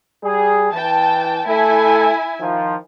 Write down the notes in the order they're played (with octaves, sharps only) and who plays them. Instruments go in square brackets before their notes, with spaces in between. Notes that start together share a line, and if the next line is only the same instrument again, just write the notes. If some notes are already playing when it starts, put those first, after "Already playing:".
[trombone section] G3 G#4
[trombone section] E3 [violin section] G5 A5
[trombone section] A3 A4 [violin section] E4 G#5
[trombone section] D#3 F3